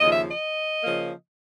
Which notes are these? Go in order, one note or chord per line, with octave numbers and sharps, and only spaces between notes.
D#2 C#3 F3 D#5
E5
D#5
C#3 F3 A#3